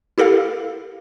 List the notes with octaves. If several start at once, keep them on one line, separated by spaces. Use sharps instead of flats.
E4 G4 A4 A#4 F5